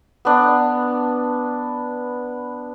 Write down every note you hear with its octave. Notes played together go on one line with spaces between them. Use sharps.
B3 D4